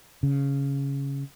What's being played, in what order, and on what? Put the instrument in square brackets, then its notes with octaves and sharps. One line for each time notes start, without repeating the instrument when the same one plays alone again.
[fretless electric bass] C#3